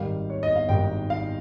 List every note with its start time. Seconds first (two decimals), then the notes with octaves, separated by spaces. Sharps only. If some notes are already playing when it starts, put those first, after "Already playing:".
Already playing: G#1 G#2 D#3 G3 F5
0.30 C#5
0.43 D#5
0.56 F5
0.69 G#1 G#2 D#3 G3 G5
1.10 F5